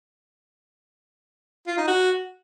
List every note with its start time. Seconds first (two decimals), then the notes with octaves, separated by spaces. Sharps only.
1.67 F4
1.78 D#4
1.88 F#4